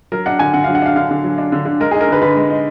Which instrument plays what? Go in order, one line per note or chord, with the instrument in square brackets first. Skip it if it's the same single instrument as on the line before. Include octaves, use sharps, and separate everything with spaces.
[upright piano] F#3 A#4
D4 F#5
D3 G#5
D3 F#5
F5
F#3
F#5
D4 F5
D3 F5
D3
F#3
D4
D3
D3
G#3 A#4
G#4
D#4
A#4
D3 B4
D3 B4
G#3
D#4